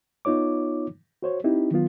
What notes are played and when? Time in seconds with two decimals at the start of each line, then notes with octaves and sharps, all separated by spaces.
0.25 B3 D#4 F4 C#5 D6
1.22 F#4 C5 C#5
1.44 C4 D#4 E4 G4
1.71 D#3 F#3 B3 F4